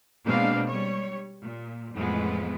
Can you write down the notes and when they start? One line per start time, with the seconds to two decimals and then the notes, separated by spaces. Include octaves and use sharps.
0.24 B2 G#3 A#3 C4 D4 F5
0.67 G3 C#5
1.41 A#2
1.93 F2 A2 E3 G#3 B3